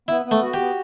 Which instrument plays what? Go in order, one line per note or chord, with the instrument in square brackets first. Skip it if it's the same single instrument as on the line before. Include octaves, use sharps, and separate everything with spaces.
[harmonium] B3 [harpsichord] E4
[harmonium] B3
[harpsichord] A3
[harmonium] F#4
[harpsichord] G4
[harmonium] B3